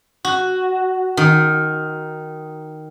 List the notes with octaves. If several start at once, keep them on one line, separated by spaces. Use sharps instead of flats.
F#4
D#3